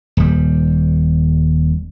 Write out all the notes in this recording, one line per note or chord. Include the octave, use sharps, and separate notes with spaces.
D#1 G3